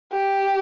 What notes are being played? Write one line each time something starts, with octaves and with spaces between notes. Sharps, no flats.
G4